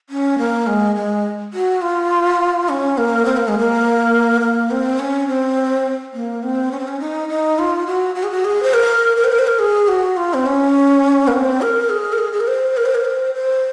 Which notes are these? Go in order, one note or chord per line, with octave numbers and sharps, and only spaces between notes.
C#4
A#3
G#3
G#3
F#4
F4
C#4
A#3
C4
A#3
G#3
A#3
A#3
C4
C#4
C4
A#3
C4
C#4
C4
C#4
D#4
D#4
F4
F#4
F#4
G#4
F#4
G#4
C5
A#4
A#4
C5
A#4
C5
A#4
G#4
F#4
F4
C4
C#4
A#3
C4
A#4
G#4
A#4
G#4
G#4
A#4
C5
A#4
C5
A#4
C5
C5